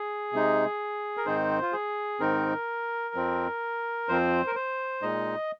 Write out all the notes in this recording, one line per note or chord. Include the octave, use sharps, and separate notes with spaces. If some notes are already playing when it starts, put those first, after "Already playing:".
Already playing: G#4
C3 G#3 D#4
A#4
G#2 D#3 C4 D#4 C5
F4
G#4
G#2 D#3 C4 D#4 A#4
F2 F3 C4
F2 F3 C4 C5
A#4
C5
A#2 G#3 D#4 D#5